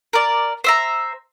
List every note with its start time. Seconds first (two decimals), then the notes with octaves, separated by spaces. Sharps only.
0.13 A#4 D5
0.64 C5 E5 A#5